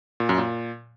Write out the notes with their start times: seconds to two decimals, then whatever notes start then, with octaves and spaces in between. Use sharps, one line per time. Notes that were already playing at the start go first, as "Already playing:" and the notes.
0.20 A#2
0.29 F#2
0.38 A#2